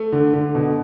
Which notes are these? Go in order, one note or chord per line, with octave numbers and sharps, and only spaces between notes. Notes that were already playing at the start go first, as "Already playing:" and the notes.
Already playing: A3
D3
D3
B2